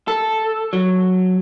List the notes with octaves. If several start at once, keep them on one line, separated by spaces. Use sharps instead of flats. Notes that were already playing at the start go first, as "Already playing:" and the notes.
A4
F#3